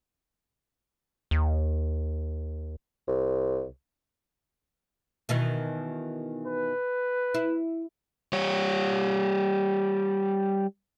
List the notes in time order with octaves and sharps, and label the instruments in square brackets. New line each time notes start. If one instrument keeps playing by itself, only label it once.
[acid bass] D#2
[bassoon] C2
[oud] B2 D#3 E3
[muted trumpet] B4
[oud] E4
[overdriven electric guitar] G3 C#5